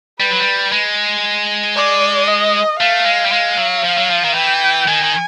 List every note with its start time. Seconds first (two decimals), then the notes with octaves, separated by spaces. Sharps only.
0.20 G3 B4
0.30 F#3
0.40 G3
0.72 G#3
1.76 D5
2.28 D#5
2.80 A3 F5
3.06 G#3
3.25 G3
3.32 G#3 F5
3.57 F#3
3.84 F3
3.98 F#3
4.10 F3
4.24 D#3
4.35 E3 G5
4.88 D#3 G#5
5.03 D#3